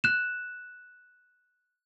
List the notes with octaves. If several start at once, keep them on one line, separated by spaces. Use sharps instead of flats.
F#6 E7